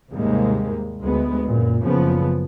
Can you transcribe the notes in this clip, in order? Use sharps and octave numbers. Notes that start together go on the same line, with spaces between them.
D#2 G#2 C3 G3 G#3 A#3
D2 G#3 B3
F#2 A#2
F#1 C#3 F3 B3